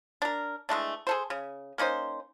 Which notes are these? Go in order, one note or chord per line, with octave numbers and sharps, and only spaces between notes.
D4 A#4
E3 G#3 A3 D4
G#4 A4 C5
C#3
A#3 C#4 D#4 C5